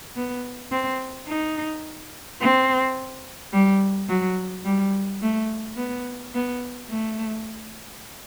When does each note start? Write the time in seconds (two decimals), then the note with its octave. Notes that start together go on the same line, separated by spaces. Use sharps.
0.16 B3
0.71 C4
1.28 D#4
2.41 C4
3.53 G3
4.08 F#3
4.65 G3
5.22 A3
5.77 B3
6.34 B3
6.90 A3